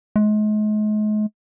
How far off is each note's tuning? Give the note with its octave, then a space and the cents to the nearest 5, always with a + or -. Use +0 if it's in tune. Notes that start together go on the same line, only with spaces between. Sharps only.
G#3 +40